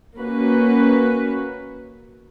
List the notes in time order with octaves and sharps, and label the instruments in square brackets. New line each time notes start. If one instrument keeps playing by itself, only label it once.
[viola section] A#3 C#4 F#4 B4